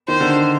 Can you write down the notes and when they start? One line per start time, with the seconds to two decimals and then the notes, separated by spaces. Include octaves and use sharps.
0.08 D#3 C5
0.21 D3